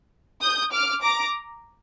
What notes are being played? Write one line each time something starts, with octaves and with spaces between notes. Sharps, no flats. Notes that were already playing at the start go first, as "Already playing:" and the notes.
D#6 G6
D6 F6
A#5 D6